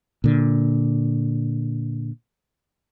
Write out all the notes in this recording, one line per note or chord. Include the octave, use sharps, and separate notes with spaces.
A#2 D3